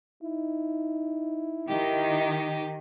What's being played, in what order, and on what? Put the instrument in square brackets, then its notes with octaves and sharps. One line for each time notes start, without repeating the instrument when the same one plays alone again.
[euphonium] D#4 [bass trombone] E4
[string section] D#3 [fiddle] G4 D#5